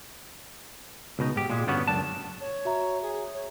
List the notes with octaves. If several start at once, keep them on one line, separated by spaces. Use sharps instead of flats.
C#2 B2 D#4
G#2 G4
A#2 G#3
G2 D3 G3 B3 C#4 F#4
C#2 F#2 D4 A5
C#5
F#4 E5 A#5
G#4
C#5